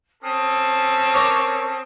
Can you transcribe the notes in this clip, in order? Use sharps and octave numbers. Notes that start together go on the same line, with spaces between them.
C4 C#4 A4 D#6
A#4 C#5 D6